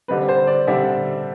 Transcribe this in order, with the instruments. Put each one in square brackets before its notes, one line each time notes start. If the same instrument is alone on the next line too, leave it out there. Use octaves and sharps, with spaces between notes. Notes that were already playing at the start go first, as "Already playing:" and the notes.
[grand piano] D3 G3 C4 B4
C5
D5
D3 G3 C4 E5